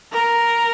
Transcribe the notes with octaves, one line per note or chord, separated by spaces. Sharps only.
A#4